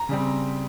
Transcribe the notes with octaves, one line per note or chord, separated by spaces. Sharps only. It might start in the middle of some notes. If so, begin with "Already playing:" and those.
Already playing: A#5
C#3 G3 C4